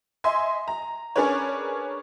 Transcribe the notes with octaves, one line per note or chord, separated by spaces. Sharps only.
D#5 E5 G#5 C6
A#5
C#4 D4 G#4 A#4 B4 C#5